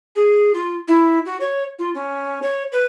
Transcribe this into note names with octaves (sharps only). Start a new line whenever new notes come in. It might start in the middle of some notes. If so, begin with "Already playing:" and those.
G#4
F4
E4
F#4
C#5
F4
C#4
C#5
B4